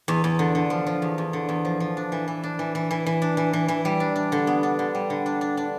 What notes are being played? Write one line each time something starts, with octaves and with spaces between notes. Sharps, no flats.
E2
E2
D3
D3
F3
F3
E2
E2
D3
E2
F3
F3
D4
E3
E3
D4
E3
E3
E3
E3
D4
E3
E3
E3
G3
D4
D4
D3
B3
D4
D3
G3
D3
D4
D4
D4